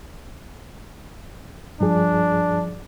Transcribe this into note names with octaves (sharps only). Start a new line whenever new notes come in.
G2 F3 D4 G#4